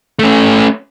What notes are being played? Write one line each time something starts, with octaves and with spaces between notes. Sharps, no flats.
A3 C#4